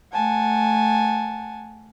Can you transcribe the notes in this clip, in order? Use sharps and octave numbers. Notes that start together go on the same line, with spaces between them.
A3 F#5 G#5 A5